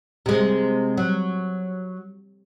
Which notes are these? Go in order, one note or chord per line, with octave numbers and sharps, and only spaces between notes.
C3 G#3
F#3